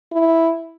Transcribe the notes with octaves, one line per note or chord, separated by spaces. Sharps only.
E4